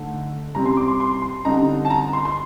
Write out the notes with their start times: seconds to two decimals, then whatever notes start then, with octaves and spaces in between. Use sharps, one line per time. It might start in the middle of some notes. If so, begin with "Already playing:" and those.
Already playing: D3 A3 D#4
0.55 C3 G3 C4 A#5
0.65 C6
0.77 D6
0.88 C6
1.00 C6
1.22 C6
1.45 D3 G3 C4 D#4 A#5
1.85 A5
1.90 A#5
2.13 C6
2.25 C6